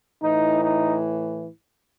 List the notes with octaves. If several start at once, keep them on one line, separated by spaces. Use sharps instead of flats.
A2 E3 D#4
D#4